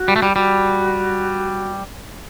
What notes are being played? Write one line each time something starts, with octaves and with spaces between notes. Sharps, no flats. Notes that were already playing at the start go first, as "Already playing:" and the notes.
Already playing: F#4
G3
A3
G3
G3 F#4